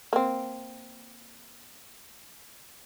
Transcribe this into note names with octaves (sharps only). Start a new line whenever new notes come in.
A#3 C4